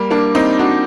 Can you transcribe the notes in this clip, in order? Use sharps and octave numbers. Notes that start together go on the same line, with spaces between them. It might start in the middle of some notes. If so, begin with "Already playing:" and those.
Already playing: G3 A#3
A#3 D4
C4 D#4
D4 F#4